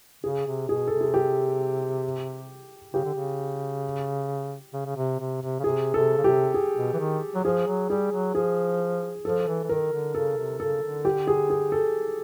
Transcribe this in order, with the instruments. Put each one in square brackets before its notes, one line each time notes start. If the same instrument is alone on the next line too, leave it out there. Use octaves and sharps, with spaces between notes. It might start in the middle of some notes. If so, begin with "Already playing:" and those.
[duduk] C#3 [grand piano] G#4
[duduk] C3
[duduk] B2 [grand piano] G#4
[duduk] C3 [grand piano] A4
[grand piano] G#4
G4
[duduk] C#3 [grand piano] G4
[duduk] D3
C#3
C#3
C#3
C3
C3
C3
C#3
[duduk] C3 [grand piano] G#4
[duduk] C3 [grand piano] A4
[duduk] C#3
[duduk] C3 [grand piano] G4
[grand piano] G#4
[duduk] B2
E3
D#3
F#3
[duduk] F3 [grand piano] G#4
[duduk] F#3
[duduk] G3 [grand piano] G#4
[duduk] F#3
[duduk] F3 [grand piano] G#4
[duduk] F3 [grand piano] A4
[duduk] E3
E3
[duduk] D#3 [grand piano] A#4
[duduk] D3
[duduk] C#3 [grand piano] A4
[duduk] C3
[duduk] C#3 [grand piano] A4
[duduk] D3
[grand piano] G4
G#4
G#4
A4